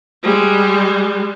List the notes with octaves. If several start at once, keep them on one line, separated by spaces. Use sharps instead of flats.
G3 G#3